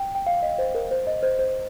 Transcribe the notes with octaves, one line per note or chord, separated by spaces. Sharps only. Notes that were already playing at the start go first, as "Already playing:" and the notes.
Already playing: G5
G5
F5
D#5
C5
A#4
C5
D#5
C5
C5